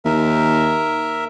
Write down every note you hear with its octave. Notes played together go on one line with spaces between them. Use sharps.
D#2 A#4 E5